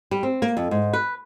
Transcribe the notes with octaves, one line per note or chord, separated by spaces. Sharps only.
G3
C4
A#3
F2
G#2
B4